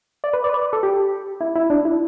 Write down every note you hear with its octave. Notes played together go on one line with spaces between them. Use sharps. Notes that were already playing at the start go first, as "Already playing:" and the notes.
D5
B4
D5
B4
D5
A4
G4
E4
E4
D4
E4